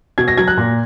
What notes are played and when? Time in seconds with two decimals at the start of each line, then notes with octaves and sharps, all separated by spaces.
0.18 B2 G#6
0.28 A#6
0.37 F#3 G#6
0.48 F#6
0.58 A#2